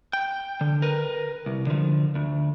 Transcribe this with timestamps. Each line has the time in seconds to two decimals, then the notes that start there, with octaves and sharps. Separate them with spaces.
0.13 G5
0.61 D3
0.82 A#4 B4
1.46 C2
1.67 D3 F3
2.15 D2